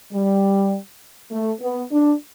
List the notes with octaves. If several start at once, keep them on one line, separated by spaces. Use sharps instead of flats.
G3
A3
B3
D4